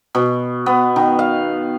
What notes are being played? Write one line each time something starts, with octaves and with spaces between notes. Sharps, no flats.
B2
B3
D#3
F5